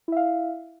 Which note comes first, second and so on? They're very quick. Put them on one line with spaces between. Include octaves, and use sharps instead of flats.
E4 E5 F5